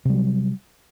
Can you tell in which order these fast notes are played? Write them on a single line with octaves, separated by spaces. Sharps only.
C3 G3 F#3